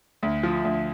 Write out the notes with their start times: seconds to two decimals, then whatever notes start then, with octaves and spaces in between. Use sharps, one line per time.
0.23 D2
0.43 F3
0.64 D2